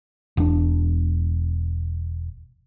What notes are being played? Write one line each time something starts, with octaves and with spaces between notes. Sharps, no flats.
E1 D4